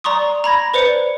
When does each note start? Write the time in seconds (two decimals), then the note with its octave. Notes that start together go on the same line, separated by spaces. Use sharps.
0.04 D5 A#5 C6 C#6 D#6
0.44 A#5 B5 G#6 A#6
0.74 B4 C5 D5 C#7